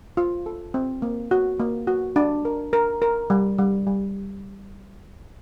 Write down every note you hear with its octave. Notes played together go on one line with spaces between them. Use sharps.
F4
A4
C4
A#3
F#4
A#3
F#4
D4
A#4
A#4
A#4
G3
G3
G3